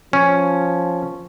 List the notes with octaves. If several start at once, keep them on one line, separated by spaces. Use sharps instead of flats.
F3 C#4